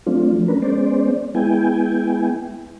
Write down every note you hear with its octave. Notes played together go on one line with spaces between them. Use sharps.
F#3 A3 C4 D4 F4
F3 A3
C#4 D4 A#4 B4
G#3 B3 C#4 C5 D5
G#3 B3 E4 G5 G#5